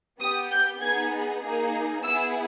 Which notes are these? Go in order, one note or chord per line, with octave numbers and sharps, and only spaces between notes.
B3 G4 D#6
G6
B3 D#4 G#4 G#6
A#3 D#4 G#4
B3 E4 G#4 E6